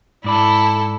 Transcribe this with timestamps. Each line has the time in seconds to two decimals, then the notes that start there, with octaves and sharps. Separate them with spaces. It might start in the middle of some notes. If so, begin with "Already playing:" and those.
0.24 G#2 E4 A4 D5 B5